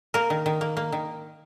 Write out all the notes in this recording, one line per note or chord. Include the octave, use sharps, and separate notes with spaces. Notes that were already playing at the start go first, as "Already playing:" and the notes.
A#3 A#4
D#3
D#3
A#3
A#3
D#3